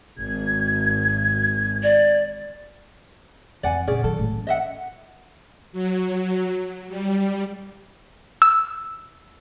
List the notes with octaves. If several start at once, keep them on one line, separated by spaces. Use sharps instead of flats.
G#1 G#6
D5
F2 E3 D5 F#5 G#5
A#2 C#3 C#4 G#4 D5
D#3 F#3 A4
A2 D#3
E3 C#4
D#5 E5 F#5
F#3
G3
E6